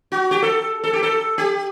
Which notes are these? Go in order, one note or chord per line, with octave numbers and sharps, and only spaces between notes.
F#4
G4
A4
A4
G4
A4
G4